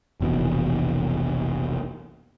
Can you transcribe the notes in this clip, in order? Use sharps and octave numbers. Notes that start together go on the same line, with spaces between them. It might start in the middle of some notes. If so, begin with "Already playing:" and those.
F1 A#1 B2 E3